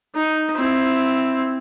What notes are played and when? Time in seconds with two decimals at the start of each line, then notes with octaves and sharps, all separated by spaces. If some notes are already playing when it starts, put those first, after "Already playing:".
0.15 D#4
0.56 C4 E4